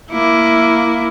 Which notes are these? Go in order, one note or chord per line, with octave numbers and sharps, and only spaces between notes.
A#3 E4